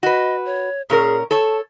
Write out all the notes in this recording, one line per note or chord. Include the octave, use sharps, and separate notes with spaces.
F#4 B4 D#5
C#5
A#2 C#4 G#4 A#4
A4 C#5 A5